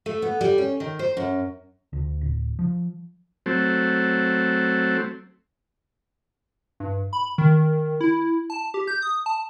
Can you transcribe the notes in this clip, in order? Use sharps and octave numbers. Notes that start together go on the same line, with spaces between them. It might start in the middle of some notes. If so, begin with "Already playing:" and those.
A3
B3
G3
C#4
D#3
C5
F#2
D2
D1
F3
F#3 A3 C4
G2
B5
D#3
E4
A5
G4
G6
D#6
A5